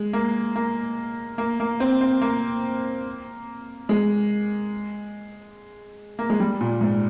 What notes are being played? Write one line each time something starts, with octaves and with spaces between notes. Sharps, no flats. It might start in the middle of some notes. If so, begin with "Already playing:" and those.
Already playing: G#3
A#3
A#3
A#3
A#3
C4
C4
A#3
G#3
A#3
G#3
G3
A#2
G#2